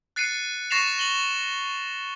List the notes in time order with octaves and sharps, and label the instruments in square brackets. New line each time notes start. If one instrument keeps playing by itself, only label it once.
[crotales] F#6 A6 C7 C#7 D#7
C#6 A6 A#6 C7 E7 F7
F#7 G7